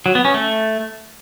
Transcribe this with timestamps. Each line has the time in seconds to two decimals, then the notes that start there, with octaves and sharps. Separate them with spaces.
0.06 F#3
0.15 B3
0.25 C#4
0.34 A3